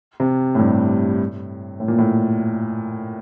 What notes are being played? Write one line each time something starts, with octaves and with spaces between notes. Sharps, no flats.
C3
A2
G2
A2
A#2
A2